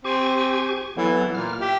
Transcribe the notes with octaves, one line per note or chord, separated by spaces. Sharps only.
C4 G4 G#5 C#6
E3 F#3 B3 A4
A#2 F6
G4 E5